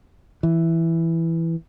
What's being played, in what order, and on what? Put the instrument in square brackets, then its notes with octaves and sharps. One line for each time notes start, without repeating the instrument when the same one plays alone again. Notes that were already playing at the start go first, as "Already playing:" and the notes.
[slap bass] E3